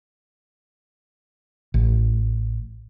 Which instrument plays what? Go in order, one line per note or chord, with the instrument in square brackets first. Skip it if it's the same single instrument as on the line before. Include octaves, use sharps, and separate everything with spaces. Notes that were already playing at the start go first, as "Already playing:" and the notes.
[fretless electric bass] A1